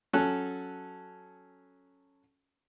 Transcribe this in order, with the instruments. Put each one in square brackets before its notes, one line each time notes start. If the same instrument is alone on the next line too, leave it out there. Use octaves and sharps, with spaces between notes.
[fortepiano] F#3 C#4 A4 F#6